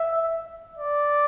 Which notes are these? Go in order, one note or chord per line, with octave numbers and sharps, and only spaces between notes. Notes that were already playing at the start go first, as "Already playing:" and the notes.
Already playing: E5
D5